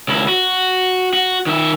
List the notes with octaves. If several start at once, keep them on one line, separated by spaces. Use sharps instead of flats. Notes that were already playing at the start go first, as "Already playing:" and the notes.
C#2 E4
F#4
F#4
D#3 E5